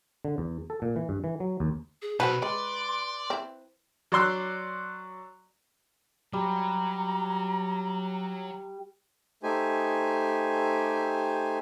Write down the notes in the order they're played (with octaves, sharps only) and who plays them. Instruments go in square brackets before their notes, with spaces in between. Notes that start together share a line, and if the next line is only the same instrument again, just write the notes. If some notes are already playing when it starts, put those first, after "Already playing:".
[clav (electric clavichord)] D3
E2
A4
A#2
E3
G2
E3
F#3
D#2
[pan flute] G#4
[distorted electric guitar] B1 [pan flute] F#4 [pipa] B4 [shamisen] C5 F#5 A5
[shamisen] G#3 [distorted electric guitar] D5 [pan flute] C6
[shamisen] C4 E4
[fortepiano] F#3 D5 C6 E6 F#6
[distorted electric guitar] F#3 [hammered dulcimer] G3 [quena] A#5
[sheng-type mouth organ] A3 D#4 G4 C5 G#5